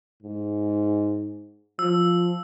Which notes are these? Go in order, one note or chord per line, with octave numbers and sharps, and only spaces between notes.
G#2
F3 E6